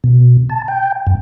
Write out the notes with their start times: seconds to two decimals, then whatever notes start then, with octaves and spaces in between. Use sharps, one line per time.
0.04 B2
0.50 A5
0.68 G5
1.07 F#2